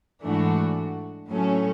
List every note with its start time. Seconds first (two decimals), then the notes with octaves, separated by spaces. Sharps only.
0.23 G#2 E3 A3 D4 F#4
1.29 A2 F#3 A3 C#4